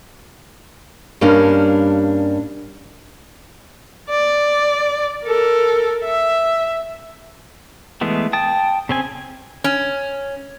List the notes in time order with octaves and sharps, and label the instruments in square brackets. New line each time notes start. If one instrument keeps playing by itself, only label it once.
[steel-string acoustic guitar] G2 G3 A#3 C#4 D4
[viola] D5
A4 A#4
E5
[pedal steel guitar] E3 G#3 A3 B3
G5 A5 D#6
C#3 C4 G#5
[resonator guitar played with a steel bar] C#4